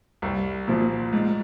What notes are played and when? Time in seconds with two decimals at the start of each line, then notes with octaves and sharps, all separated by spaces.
0.22 C2
0.67 A#2 F3
1.13 G#2